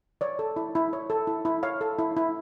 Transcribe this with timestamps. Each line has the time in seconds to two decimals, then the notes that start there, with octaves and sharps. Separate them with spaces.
0.21 C#5 D5
0.39 A4
0.56 E4
0.75 E4
0.93 C#5
1.10 A4
1.27 E4
1.45 E4
1.63 C#5 F5
1.81 A4
1.99 E4
2.17 E4